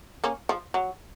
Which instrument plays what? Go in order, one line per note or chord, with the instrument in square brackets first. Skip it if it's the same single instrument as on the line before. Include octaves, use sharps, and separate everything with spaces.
[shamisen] A#3 C#4
F3
F#3